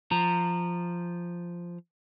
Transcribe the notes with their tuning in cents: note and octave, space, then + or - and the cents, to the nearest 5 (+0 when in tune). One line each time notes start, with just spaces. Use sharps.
F3 -5 A#5 -15